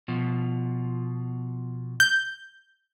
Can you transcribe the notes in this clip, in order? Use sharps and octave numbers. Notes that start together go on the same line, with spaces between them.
B2 F3
G6